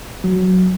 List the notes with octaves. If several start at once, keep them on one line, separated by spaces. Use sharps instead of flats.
F#3